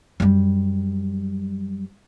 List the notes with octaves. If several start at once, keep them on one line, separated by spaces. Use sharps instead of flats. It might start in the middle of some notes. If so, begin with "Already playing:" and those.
F#2 G3